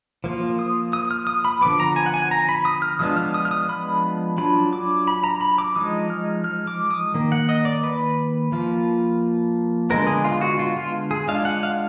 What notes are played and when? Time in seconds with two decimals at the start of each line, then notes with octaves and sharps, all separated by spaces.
0.24 F3 A#3 F4
0.59 D#6
0.93 D#6
1.11 F6
1.27 D#6
1.45 B5
1.61 D3 F3 B3 D6
1.80 A#5
1.96 G#5
2.06 F#5
2.14 G#5
2.31 A#5
2.49 B5
2.65 D#6
2.82 F6
2.99 F3 G#3 B3 D4 F4 D#6
3.17 F6
3.34 D#6
3.45 F6
3.51 D#6
3.69 B5
4.38 F#3 D4 F4 B5
4.73 D6
5.07 B5
5.24 A#5
5.41 B5
5.58 D6
5.76 F3 G#3 D#4 D#6
6.10 F6
6.44 F6
6.67 D6
6.91 D#6
7.14 D#3 A#3
7.32 F#5
7.49 D#5
7.65 D5
7.84 B4
8.52 F3 A#3 F4
9.90 D3 G#3 B3 A#4
10.07 G#4
10.24 F4
10.41 F#4
10.59 F4
10.77 F4
11.11 G#4
11.28 G#3 D4 F4 F5
11.45 F#5
11.63 F5